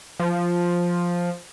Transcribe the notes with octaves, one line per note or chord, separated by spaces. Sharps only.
F3